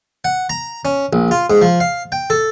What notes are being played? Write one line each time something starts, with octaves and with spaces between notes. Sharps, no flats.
F#5
A#5
C#4
A#1
F4
G#2
F3
F5
G5
A4